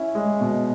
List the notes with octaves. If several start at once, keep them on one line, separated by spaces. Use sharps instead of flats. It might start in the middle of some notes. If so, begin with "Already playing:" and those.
Already playing: C#4 E4
G#3
B2